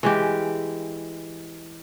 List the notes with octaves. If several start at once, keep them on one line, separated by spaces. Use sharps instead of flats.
E3 G#3 G4